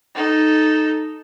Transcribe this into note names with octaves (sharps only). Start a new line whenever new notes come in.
D#4 A4